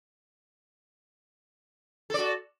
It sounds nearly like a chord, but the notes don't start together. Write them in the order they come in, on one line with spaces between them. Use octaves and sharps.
A4 D5 F#4